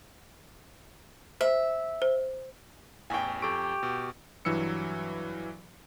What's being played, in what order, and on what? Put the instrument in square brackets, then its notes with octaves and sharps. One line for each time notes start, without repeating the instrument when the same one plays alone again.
[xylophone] C5 [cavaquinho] E5
[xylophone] C5
[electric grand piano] A1 E2 C#6 [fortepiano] G5 G#5
[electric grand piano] F2 A4 D7 [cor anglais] G4 [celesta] C#6
[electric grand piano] B2
G2 E3 F#3 E6 C#7